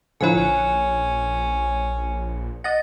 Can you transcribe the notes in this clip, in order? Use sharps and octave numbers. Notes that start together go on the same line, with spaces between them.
A2 D3 F3 F#3 E4 C#5 G#5
A#1 C#4
D#5 F#5 A6 A#6